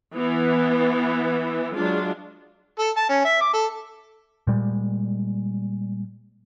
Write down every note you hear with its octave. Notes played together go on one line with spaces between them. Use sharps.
E3 B3
F#3 G#3 D4 F4
A4
A5
C#4
E5
D6
A4
A#2 G3 G#3